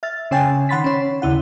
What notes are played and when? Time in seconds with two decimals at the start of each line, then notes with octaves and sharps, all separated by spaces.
0.03 E5 F6 A6
0.31 C#3 C#4 C#5 G5 G#5 A6
0.69 D#3 F#5 B5 C6 A6 B6
0.84 C#4 C#5
1.22 D#2 C#3 E4 F#5